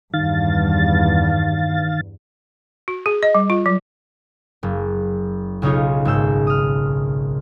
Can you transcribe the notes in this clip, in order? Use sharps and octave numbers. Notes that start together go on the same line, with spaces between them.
E2 G2 D#3 F5 A6
F#4
G#4
D#5
G3
F4
F#3
F#1
B1 C#3 C#4 D#4 F4 C#5
G#1 G#3 C#5 E6 G6
D#6 F6